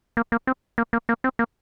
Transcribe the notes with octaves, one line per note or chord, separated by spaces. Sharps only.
A#3
A#3
C4
A#3
A#3
A#3
C4
A#3